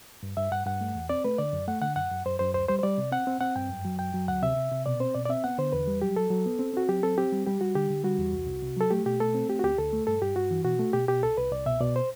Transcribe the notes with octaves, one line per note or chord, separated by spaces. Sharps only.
G2
G2 E5
G2 F#5
G2 F#5
A3
E2
C4 D5
A3 B4
D3 D5
F#2
A3 F#5
D3 F#5
F#2 F#5
F#2
F#2 C5
F#2 C5
D2 C5
G3 C5
C5
G3 D5
C3
C4 F#5
C4
C4 F#5
G2 G5
F#2
F#3
F#2 G5
F#3
D2 F#5
C3 E5
C3
C3
B2 D5
C4 C5
B2 D5
D5
C4 E5
B3 F#5
D3 C5
E2 B4
G3
F#3 G4
F#3 A4
F#3
B3
C4
C4 F#4
F#3 G4
C4 A4
C4 G4
G3
G3 G4
G3 F#4
D3 G4
D3
G3 F#4
E2
C2
C2
C3
F#3 A4
A3 G4
B2 G4
A3 A4
C4
A3 G4
F#4
D2 G4
D2 A4
A3
G2 A4
G2 G4
G2 F#4
E3
B2 F#4
A3
B2 G4
B2 G4
C2 A4
C2 B4
C2 D5
B2 E5
B2 D5
C5